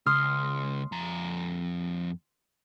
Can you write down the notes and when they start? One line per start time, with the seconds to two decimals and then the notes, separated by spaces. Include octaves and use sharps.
0.06 C#2 C6 D#6 F6
0.92 F2 A#5